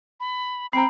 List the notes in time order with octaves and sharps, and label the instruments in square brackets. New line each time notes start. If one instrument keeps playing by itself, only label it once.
[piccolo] B5
[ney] C4 [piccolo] G5 [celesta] A#5 C7 [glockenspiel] B5